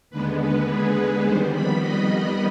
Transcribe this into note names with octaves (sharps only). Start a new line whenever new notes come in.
D#2 D3 G#3 B3 B4
B4
G#4
B4
F2 D#3 G3 B3 C5
B5
D#5